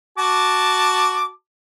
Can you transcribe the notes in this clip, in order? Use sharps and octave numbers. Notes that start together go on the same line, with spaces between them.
F#4 A5 D6